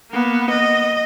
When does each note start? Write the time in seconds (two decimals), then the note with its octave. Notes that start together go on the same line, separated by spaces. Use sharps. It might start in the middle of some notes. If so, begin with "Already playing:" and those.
0.11 A#3 B3
0.50 D#5